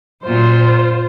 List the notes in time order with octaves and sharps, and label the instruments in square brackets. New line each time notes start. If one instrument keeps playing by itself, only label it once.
[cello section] F#2 A#2 [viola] F4 C5